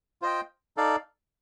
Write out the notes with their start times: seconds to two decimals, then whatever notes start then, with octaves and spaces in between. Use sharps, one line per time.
0.22 F4 C5 D#5 G5
0.77 D#4 A4 D5 F5